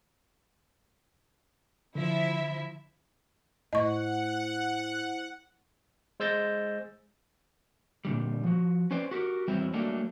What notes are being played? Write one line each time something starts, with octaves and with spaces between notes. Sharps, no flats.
D3 F3 E4 E5
A2 E4 C5 D#5 F#5 C#6
G#3 C5 E6 G6 A6 A#6
A#2 D3 G3
F3 F#4
C#4 B4 C5 D5
F#4 G4 A#4
E2 F#3 G3 C4 E4
F#3 G3 A3 A#3 D4